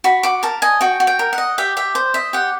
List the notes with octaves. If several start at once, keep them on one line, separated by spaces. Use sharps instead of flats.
F#4 B5
F#4 D6
A#4 A5
D#5 G#5
F#4 G5
F#4
G5
A#4
F#5
D#5
G4 E5
G4 E5
C5
D#5 E5
G4 F#5